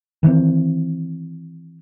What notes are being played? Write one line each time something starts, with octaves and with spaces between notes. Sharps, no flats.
D#3 E3 B3 C4